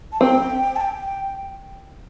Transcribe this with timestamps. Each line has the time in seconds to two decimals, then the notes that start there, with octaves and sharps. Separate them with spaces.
0.12 A5
0.21 C4 G5
0.76 A5
0.81 G5